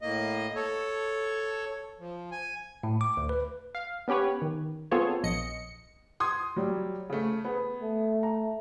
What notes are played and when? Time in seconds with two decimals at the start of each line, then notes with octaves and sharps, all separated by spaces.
0.02 A2 A#3 D#5
0.56 A4 C#5
2.00 F3
2.32 G#5
2.83 A2
3.01 D6
3.17 D2
3.29 B4
3.75 F5
4.08 B3 C#4 G4 B4 C#5
4.42 D#3
4.91 B3 C4 F4 G#4 A4 C#5
5.24 A#1 D#5 C#7
6.20 C6 D#6 G#6
6.56 F#3 G3
7.10 C#3 A3
7.45 B3 G#4
7.82 A3
8.23 A#5